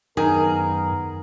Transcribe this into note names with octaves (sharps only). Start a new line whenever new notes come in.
F#2 D#3 B3 G#4 A#4